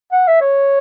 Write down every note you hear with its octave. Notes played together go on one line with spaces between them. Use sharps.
F#5
E5
C#5